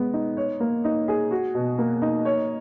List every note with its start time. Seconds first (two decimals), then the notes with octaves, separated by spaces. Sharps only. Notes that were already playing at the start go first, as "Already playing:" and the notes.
Already playing: G#3 B3
0.13 D#4
0.37 C#5
0.60 A#3
0.84 D#4
1.08 G#4
1.31 F#4
1.55 B2
1.78 A#3
2.02 D#4
2.25 C#5